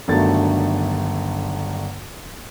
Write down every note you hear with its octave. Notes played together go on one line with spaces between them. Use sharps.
G1 D3 D#3 F#3 A3 A6